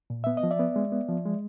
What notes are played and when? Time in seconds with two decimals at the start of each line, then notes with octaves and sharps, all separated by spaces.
0.10 A#2
0.24 B3 E5
0.37 D#5
0.43 F3
0.51 D5 E5
0.59 B3
0.76 G#3
0.92 B3
1.09 F3
1.25 G#3